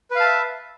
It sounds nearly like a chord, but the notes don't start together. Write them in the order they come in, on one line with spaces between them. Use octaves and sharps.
B4 F5 A5 E5